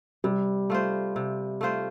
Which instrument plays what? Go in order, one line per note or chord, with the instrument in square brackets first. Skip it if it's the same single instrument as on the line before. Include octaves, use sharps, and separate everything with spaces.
[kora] C3 [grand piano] G3
[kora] A3 F4 C5
C3
A3 F4 C5